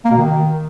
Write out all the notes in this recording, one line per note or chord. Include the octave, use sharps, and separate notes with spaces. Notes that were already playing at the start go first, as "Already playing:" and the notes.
A#3
B2
D#3